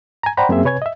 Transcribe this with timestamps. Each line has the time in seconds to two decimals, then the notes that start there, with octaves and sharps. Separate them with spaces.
0.23 G#5 A#5
0.37 C5 D5 F#5 G5 A#5 B5
0.49 F#2 A#3 C4 G#4 E5
0.65 C3 B4 C#5 G#5 G#6
0.82 D#5 E5